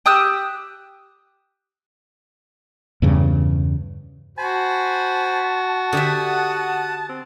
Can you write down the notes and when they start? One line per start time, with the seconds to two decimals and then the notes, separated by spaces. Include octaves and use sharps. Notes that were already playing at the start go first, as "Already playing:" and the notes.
0.06 G4 D#6 E6 F#6
3.02 E2 G2 C#3
4.38 F#4 C5 G#5 A5 B5
5.92 D3 G4 E5 F#5 D#6
7.09 C4